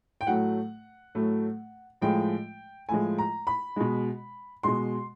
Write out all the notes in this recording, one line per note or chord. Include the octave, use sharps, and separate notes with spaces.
G5
A2 F#3 A3 F#5
A2 F#3 A3
A2 F3 G#3 G5
A2 F3 G#3 G#5
A#5
B5
B2 G#3
B2 G#3 C6